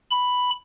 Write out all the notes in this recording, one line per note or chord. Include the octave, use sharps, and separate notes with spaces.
B5